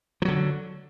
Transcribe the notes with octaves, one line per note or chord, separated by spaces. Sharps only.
D3 F3 F#3